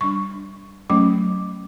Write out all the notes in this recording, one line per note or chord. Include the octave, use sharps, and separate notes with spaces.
G3 D4 C#6
F#3 A3 C#4 D6